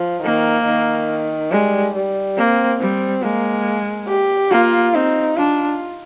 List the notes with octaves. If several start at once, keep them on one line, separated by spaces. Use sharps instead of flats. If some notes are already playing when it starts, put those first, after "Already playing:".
Already playing: F3
D#3 A#3
D#3
G3 G#3
G3
A#3 C4
G3 C4
G#3 A#3
G4
A#3 F4
C4 D#4
D4 F4